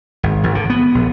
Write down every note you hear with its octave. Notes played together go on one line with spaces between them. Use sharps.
G#1
G#1
D3
B3
A#1